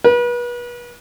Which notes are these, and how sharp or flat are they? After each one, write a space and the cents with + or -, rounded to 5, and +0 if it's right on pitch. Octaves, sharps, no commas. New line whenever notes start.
B4 -35